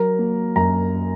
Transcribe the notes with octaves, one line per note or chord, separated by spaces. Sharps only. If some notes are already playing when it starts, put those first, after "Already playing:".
Already playing: F#3 A#4 A#5
A#3
F#2 A#5